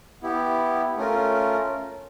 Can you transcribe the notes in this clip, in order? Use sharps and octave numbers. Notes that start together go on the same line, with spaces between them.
B3 E4 G4
A3 C#4 F4 A#4